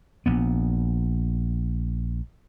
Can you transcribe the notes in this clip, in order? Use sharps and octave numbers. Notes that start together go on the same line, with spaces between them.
A#1 B3